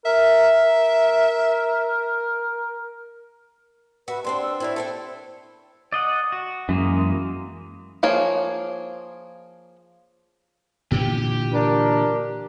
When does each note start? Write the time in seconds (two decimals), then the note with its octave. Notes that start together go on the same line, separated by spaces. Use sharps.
0.06 A#4 E5
0.63 A#4
4.08 F#4 B4 E5
4.24 G2 C4 D4 C6
4.42 E6
4.60 C4 D4 E4 C#5
4.76 A4 C5 G5
5.92 D5 D#5 F#5
6.32 F#4
6.69 F#2 E3 G#3 A#3
8.03 F3 A#3 G#4 C#5
10.92 A#2 D3 E3 G4
11.54 D4 A#4